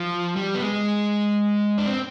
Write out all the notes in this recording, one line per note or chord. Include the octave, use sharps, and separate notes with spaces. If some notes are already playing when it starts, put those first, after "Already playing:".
Already playing: F3
G3
B3
G#3
D4
C4